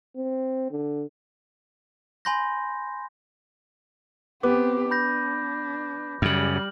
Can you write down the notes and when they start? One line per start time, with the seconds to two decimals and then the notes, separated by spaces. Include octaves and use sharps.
0.16 C4
0.71 D3
2.25 G#5 B5 C6 G6 A#6
4.43 B3 C4 G4 D6
4.91 D4 B5 G6 A#6
6.22 F#2 C#3 G3 F6 F#7